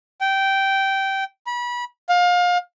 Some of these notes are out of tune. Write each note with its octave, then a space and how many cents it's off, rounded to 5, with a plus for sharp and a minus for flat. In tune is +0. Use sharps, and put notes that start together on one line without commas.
G5 -15
B5 -30
F5 +30